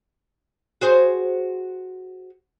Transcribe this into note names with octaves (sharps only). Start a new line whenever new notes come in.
F#4 G#4 C5